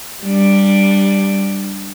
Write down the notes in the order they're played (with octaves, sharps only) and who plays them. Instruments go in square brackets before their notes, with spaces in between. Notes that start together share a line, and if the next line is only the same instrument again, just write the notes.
[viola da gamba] G3 D4